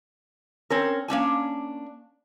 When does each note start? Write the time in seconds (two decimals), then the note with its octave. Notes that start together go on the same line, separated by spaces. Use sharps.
0.70 C4 C#4 A#4
1.08 A#3 C#4 D4 G#5